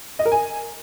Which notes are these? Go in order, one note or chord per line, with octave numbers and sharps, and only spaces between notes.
D#5
A#4
G#5